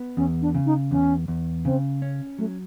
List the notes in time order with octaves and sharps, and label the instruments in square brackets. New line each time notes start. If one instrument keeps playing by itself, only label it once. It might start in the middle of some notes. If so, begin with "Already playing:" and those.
Already playing: [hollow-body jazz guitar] B3
[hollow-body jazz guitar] E2 [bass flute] C#4
[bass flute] D4
[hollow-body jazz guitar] C#3
[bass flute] D#4
[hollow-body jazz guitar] E2 [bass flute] C#4
[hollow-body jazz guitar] E2
[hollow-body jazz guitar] C#3 [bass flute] C4
[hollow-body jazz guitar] C#4
[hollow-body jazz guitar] F#3 [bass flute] A3